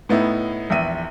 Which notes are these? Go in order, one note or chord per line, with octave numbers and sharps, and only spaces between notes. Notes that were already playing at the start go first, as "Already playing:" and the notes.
A2 B3 D#4 E4
A#1 E2 E5 D#7